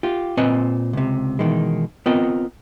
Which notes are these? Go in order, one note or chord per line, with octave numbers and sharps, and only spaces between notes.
F4 G4
A#2 C4 B4 C5 D#5 G#5
C#2 C3
B2 D#3 E3 G#3
B3 C4 F4 A#4 D#5